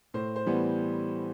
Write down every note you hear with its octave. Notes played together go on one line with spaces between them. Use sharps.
A2 C5
C5
E3 G3 B3